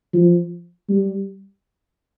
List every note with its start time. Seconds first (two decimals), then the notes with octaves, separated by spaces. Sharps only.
0.13 F3
0.89 G3